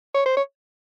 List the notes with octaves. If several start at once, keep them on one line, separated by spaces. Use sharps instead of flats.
C#5
C5
C#5